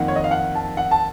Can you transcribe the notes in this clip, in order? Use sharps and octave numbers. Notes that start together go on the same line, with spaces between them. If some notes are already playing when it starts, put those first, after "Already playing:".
Already playing: F2 D#3 A#3 F#5
C#5
D#5
F5
F#5
A5
F#5
A5